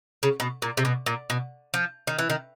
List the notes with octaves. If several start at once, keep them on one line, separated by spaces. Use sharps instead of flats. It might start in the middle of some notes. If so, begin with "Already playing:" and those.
C#3
B2
A#2
C3
B2
A#2
B2
F3
D#3
E3
D#3